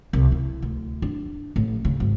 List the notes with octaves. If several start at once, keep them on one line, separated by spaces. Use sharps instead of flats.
C2
E4
D2
D4
A1
C#3
G#1